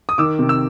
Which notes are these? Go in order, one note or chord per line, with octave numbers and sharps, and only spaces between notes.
D#6
D#3 D6 E6
C3
E6